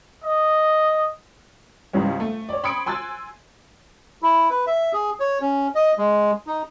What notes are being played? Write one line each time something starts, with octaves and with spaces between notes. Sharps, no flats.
D#5
C#2 G#2 C#3 E3 G3 C#4
A3
C#5 D5
B5 C6 D#6 G#6 C#7 D7
G#5 C6 E6 F#6 G#6 A6
E4
B4
E5
G#4
C#5
C#4
D#5
G#3
D#4